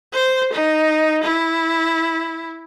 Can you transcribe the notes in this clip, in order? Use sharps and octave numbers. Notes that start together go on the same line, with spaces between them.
C5
D#4
E4